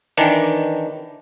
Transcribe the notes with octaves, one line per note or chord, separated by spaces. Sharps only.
D#3 E3 D4